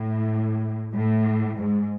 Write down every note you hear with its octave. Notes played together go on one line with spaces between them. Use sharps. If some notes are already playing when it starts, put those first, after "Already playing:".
Already playing: A2
A2
G#2